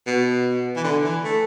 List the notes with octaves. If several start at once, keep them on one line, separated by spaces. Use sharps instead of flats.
B2
E3
D3
E3
A3